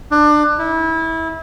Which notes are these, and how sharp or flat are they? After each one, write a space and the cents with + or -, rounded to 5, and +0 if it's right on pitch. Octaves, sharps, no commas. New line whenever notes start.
D4 +25
E4 -25